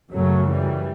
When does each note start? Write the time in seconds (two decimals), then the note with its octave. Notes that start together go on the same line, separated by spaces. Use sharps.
0.12 F#2 C#3 F#3 A3
0.49 E3 G3